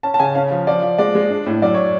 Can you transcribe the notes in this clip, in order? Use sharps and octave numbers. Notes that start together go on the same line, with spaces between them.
C#4 A5
A5
C#3 G#5
C#4 F5
F3
F3 D5
F3
G#3 D5
G#3
D4
A2
F#2 D5
C#5